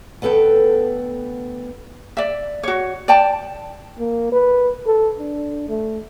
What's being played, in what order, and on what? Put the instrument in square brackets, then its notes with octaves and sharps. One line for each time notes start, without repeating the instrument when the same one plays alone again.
[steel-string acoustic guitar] D2 B3 A4 B4 G5
[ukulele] D5 E5
F#4 C#5
D5 G5 A5
[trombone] A#3
B4
A4
D4
A3